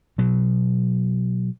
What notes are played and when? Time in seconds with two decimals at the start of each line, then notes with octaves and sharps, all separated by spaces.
0.18 B2 F#3